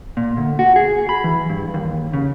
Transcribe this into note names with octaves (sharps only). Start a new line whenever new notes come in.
A#2
D2
F#4
G#4
B5
E3
G2
D#2
C#3